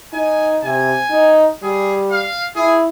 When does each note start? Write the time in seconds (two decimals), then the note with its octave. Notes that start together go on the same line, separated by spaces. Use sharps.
0.13 D#4 G#5
0.63 C3 G#5
1.10 D#4
1.63 G3 G#4
2.11 F5
2.56 E4 G#4